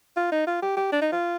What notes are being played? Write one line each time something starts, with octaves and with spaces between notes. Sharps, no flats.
F4
D#4
F4
G4
G4
D4
D#4
F4